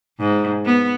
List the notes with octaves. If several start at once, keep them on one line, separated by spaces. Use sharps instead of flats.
G#2
B3